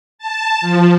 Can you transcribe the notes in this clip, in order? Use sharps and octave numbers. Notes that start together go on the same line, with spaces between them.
A5
F3